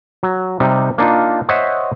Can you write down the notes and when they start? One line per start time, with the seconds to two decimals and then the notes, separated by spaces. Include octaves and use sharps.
0.23 F#3
0.60 C3 G3 D#4
0.98 A#3 D4 D#4 F4
1.49 C5 C#5 D#5 E5 F#5